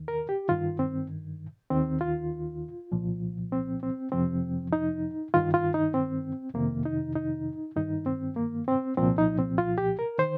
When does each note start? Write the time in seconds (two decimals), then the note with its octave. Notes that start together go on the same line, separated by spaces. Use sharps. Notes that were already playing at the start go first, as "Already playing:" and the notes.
Already playing: D#2 D#3
0.08 A#4
0.29 G4
0.49 G2 D#3 F4
0.79 C4
1.70 D#2 D#3 C4
2.01 F4
2.92 C2 A#2 F3
3.52 C4
3.83 C4
4.12 F2 C3 F3 C4
4.73 D#4
5.34 G2 D#3 F4
5.54 F4
5.74 D#4
5.94 C4
6.55 F2 C3 D#3 A#3
6.85 D#4
7.16 D#4
7.76 G2 D#3 D#4
8.06 C4
8.36 A#3
8.68 C4
8.97 C2 A#2 F3 C4
9.18 D#4
9.38 C4
9.58 F4
9.78 G4
9.99 A#4
10.19 D#3 C5